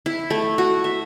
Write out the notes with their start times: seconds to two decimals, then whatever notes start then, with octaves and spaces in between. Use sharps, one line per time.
0.06 E4
0.30 A3
0.58 F#4
0.84 E5